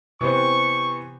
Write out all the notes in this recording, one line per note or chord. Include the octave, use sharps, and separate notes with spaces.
C3 E3 B3 G4 C5 C#6